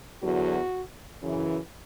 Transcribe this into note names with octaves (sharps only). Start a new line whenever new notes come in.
E2 D3 F#3 F#4
F#2 C#3 E3